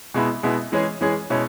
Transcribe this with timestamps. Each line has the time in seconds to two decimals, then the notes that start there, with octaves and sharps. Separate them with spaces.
0.14 B2 G#3 B3 E4
0.43 B2 G#3 B3 E4
0.72 E3 G#3 C#4 G#4
1.01 E3 G#3 C#4 G#4
1.30 B2 G#3 C#4 E4